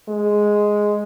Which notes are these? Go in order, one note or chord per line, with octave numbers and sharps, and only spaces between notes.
G#3